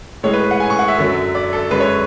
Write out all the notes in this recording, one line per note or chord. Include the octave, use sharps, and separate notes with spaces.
A2 G#3 C#5
B4
F#5
G#5
C#6
F#5
E5
F#2 D3 F#3
D5
A4
F#2 D3 G#3 B4
C#5